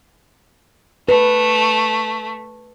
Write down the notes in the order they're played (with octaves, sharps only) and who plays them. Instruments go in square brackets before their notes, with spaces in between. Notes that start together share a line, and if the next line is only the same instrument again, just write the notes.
[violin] A3 [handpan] B4